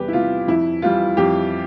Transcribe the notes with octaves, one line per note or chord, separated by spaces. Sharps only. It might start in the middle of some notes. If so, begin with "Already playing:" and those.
Already playing: E2 C3 G3 G4 B4
E4
C3 G3 F4
F2 E4
E3 G3 F4
F2 G4